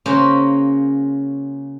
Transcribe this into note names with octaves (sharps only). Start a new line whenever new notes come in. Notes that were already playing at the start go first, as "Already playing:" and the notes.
C#3 A#3 C#4 F#4 C5